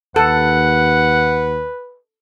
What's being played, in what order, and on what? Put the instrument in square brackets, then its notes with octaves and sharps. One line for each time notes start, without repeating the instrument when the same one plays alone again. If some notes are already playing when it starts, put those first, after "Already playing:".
[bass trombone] D#2 [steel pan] A4 [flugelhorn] B4 [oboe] F#5